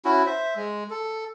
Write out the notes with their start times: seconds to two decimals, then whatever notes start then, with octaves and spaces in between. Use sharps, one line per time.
0.05 C#4 E4 F#4
0.26 C5 E5
0.56 G#3
0.90 A4